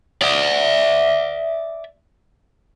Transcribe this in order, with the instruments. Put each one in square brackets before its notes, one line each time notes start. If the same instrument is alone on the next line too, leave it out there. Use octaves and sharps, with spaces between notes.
[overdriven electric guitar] D5 E5